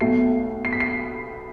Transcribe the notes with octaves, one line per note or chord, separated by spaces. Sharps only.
B1 B2 A3 C7
C7
B6
C7